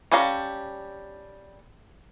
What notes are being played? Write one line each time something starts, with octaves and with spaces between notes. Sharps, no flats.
G3 C#4 A4 F5 A#5